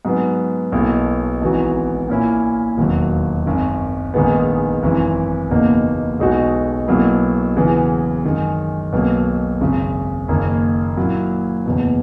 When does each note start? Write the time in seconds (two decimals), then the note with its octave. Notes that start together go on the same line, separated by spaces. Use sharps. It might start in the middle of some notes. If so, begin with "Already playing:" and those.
0.05 G#2 F#3 B3
0.72 B1 B2 A#3 E4
1.41 G#1 G#2 E3 B3 F#4
2.09 A#2 A#3 C#4 E4
2.78 E1 D#2 D#3 F#3
3.46 G#1 F#2 D#3
4.14 A#1 G#2 D#3 G#3 B3
4.83 G#1 F#2 E3
5.51 F#1 E2 B2 A#3 D#4
6.20 B1 B2 G#3 D#4 F#4
6.88 B1 B2 F#3 A#3 E4
7.56 E1 E2 C#3 E3 B3
8.24 F#2 D#3 G#3
8.93 B1 B2 F#3 A#3
9.61 G#1 F#2 C#3
10.28 F#1 F#2 D#3 A#3
10.97 A#2 F#3 A#3 E4
11.66 F#1 E2 B2